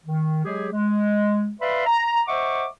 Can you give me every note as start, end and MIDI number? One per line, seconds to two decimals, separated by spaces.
0.05 0.43 51
0.45 0.68 54
0.45 0.68 56
0.45 0.68 67
0.45 0.68 68
0.73 1.53 56
1.61 1.85 71
1.61 1.85 74
1.61 1.85 76
1.61 1.85 77
1.61 1.85 83
1.61 1.85 84
1.86 2.22 82
2.27 2.67 72
2.27 2.67 75
2.27 2.67 76
2.27 2.67 78
2.27 2.67 85
2.27 2.67 86